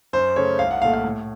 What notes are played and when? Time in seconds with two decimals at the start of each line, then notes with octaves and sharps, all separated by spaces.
0.13 F#2 C5
0.36 C#3 A3 C#5
0.59 C2 F5
0.71 F#5
0.82 A#2 F5
0.85 A3
0.93 F5
1.04 A2